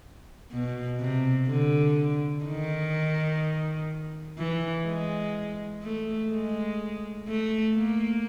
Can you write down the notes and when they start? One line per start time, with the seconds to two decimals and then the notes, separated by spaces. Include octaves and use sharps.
0.51 B2
1.00 C3
1.48 D3
2.44 D#3
4.38 E3
4.86 G#3
5.83 A3
6.31 G#3
7.28 A3
7.76 A#3